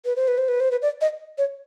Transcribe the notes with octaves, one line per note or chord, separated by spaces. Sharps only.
B4
C5
B4
C5
B4
C5
B4
D5
D#5
C#5